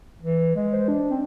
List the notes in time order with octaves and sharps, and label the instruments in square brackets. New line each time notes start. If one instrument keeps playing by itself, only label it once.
[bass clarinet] E3
G#3
[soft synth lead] C5
D4
[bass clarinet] C4